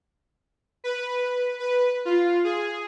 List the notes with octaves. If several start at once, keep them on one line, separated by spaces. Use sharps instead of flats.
B4
B4
B4
F4
G#4